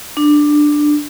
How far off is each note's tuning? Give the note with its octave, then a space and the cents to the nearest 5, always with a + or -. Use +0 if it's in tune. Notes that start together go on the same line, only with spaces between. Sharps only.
D4 +10